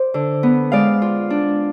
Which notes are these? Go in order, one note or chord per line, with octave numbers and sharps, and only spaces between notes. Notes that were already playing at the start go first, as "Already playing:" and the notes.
Already playing: C5 D5
D3
B3
G#3 D5 F5
F4
D4